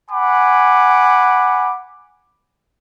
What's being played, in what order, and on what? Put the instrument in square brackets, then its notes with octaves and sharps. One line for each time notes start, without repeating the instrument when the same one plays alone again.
[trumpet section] F#5 G#5 B5 D6